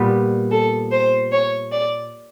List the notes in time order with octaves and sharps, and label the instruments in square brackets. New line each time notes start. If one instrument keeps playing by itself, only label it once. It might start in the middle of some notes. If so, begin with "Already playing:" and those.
Already playing: [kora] A#2 G3 B3
[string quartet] A4
C5
C#5
D5